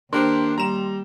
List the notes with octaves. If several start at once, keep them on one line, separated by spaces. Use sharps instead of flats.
D#2 D4 G4 A#4 C5 C6
G3 A#5 E7